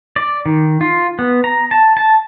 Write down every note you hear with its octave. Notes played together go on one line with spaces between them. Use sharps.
D5
D#3
F4
B3
A#5
A5
A5